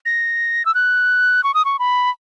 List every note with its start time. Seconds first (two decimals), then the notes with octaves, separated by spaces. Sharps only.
0.06 A#6
0.65 E6
0.75 F#6
1.44 C#6
1.54 D#6
1.65 C#6
1.79 B5